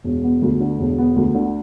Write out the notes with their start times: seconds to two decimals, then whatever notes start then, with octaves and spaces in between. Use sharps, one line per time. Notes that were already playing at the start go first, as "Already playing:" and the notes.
0.04 E1
0.23 B3
0.42 D2
0.60 D3
0.79 E1
0.98 B3
1.16 D2
1.34 D3